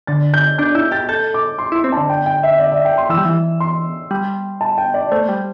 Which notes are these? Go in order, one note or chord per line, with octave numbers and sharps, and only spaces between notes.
D3 A6
G6
D4 G6
E4 G6
G4 A6
A4 G6
D6
C6
E4 C6
C4
D3 A5
G5
G5
E5
D5
E5
G5
C6
E3 E6
G3
E3
C6
G3
A5
G5
D5
A3 C5
G3